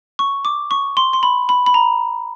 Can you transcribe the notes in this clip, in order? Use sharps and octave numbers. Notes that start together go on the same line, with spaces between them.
C#6
D6
C#6
C6
C6
B5
B5
B5
A#5